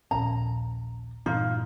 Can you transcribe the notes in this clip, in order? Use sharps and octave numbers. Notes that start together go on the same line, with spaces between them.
D#1 A#1 C#4 A#5
G2 A#2 E3 D#4 F4